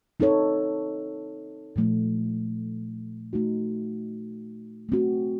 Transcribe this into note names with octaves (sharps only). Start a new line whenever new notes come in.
C4 D#4 A4 C#5
A#2 F3 A3
A3 D#4 F#4
A3 C4 F#4